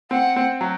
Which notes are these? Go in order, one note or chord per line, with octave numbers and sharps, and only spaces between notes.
C4 F#5
C4
F#3